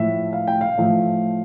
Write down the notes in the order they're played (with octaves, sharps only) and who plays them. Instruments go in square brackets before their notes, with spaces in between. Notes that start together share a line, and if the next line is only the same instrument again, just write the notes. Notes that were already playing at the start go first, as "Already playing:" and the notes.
Already playing: [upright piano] A2 F3 A3 E5
F5
G5
F5
A2 F3 A3